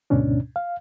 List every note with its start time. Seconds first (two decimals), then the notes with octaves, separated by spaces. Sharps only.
0.10 D2 G#2 B2 C#4 D4
0.56 F5